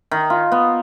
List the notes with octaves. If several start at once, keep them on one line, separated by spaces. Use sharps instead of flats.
D#3
F4
B3